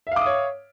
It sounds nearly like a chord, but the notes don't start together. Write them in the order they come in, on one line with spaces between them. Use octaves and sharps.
E5 F5 D6 D#6 C#5